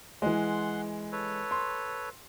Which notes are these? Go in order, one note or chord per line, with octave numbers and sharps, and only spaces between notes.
E3 G#3 F#5 C6
A4 B4 C#5
C6